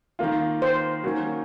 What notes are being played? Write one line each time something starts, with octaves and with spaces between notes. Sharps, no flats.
D#3 A#3 F4
C5
D#3 F#3 A#3 C#4